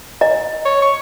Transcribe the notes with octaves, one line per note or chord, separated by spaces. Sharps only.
D#5 A#5
C#5
C#6